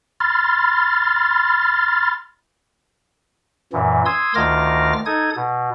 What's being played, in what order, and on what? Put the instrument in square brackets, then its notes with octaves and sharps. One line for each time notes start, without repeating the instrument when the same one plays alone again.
[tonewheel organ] B5 C6 F6 A6
[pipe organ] F#2 A#2 E3
C6 D#6 E6 G#6
D2 D#3 F4 D6 F6 A#6
D#4 A4 D#6 G#6
B2